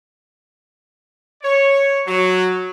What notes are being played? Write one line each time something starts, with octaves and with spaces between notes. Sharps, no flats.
C#5
F#3